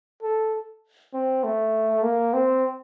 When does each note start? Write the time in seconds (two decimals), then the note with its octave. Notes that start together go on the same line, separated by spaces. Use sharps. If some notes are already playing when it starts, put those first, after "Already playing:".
0.23 A4
1.14 C4
1.44 A3
2.03 A#3
2.34 C4